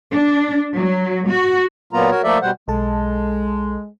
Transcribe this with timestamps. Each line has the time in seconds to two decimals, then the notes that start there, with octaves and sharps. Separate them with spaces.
0.11 D4
0.74 F#3
1.28 F#4
1.93 A#2 F#3 A#3 B3 F4 A#5
2.10 F#4 A#4 C#5
2.23 F3 A3 A#3 A4 D5 E5
2.42 B2 G3 C5 F#5
2.68 B1 G#3 A4 A5